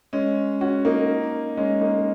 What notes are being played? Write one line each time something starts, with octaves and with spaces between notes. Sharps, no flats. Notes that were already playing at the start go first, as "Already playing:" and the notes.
G#3 C#4
C#4 F#4
A#3 D#4
G#3 C#4
A#3 D#4